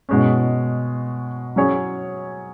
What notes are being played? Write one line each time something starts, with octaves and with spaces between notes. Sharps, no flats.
B2 G#3 C#4
F#3 C#4 G#4 C#5